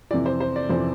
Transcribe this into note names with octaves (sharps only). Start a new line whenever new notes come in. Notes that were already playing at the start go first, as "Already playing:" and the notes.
F2 C3 E3 D5
C5
C5
D5
F2 C3 E3 C5